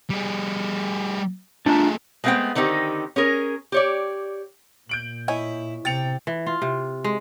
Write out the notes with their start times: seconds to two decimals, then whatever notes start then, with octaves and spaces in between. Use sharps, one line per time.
0.10 G3 G#4
1.66 A3 D4 F4 G#4 A5
2.24 G#3 A3 B3 C4 B4 G5
2.55 D3 D#3 C4 D#4 F#4 G4
3.16 C#4 G#4 A#4
3.72 G4 C#5 D5
4.89 A#2 G6 D7 F#7
5.28 E4 C#5 D#5 G#5
5.85 C3 G5 A6 C#7 F7
6.27 E3
6.46 F4
6.62 C3
7.04 G#3